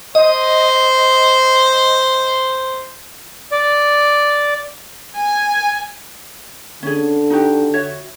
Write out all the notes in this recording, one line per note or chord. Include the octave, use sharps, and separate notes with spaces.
C5 D#5
D5
G#5
D3 C#4 G#4
D#4 F#4 G4
F#4 C#5 E5